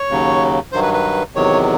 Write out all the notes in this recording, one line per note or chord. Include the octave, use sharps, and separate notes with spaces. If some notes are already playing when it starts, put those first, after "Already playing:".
Already playing: C#5
D#2 C#3 F#3
G2 D#3 F#3 C5
B4
B4
E2 C3 D#3 F#3 C#5